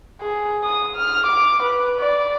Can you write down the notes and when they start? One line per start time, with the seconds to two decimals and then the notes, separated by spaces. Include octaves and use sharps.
0.21 G#4
0.63 D#6
0.96 F6
1.27 D6
1.63 B4
1.99 D5